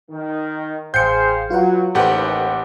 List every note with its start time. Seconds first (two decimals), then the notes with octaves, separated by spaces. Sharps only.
0.10 D#3
0.94 A1 G#4 C5 F5 G5 G6 C7 C#7
1.50 F#3 F4 B4 F#5
1.95 A1 D#2 G4 A4 B4 C5 F#5